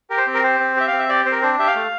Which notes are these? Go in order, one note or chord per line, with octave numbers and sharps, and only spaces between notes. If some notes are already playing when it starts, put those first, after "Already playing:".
G4 A#4
C5
C4
A#4
G4 C5
C4
G4 E5
C4 F5
E5
G4 D5
C4 C5
A#4
D4 C5
G4 E5
F5
A3